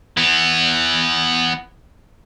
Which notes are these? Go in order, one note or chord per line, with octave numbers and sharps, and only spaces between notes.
E3 B3